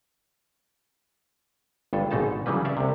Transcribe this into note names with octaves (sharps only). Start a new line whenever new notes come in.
G1 G2 A4
G#1 G#2 B2 D#4 A4 A5
C#3 E3 F#3 G3 B4
C#4 D5 E5 F5
C2 C3